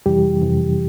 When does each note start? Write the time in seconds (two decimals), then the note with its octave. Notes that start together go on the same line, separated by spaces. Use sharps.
0.06 F2 C3 E3 G3 G4
0.42 F2 C3 E3